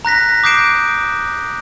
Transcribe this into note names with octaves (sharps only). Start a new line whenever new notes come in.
A#5 F#6 A#6 B6
D6 D#6 G6 C7 D7 E7